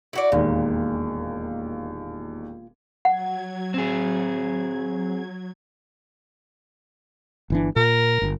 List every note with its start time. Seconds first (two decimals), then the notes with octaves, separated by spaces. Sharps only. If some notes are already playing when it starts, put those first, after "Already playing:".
0.13 E4 F#4 D5
0.32 E1 D#2 A#2
3.05 F#3 F#5 G#6
3.74 C4 G#4
7.50 G1 E3 D4
7.76 A#2 A#4
8.22 G1